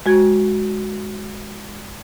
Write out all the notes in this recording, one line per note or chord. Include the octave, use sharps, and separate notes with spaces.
G#3 F#4 G#6